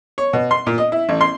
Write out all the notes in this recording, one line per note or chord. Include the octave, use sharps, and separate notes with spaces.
C#5
B2
C6
A#2
D#5
E4
A1
C6